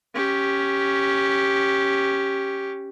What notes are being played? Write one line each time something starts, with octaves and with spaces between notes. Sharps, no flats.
C#4 G4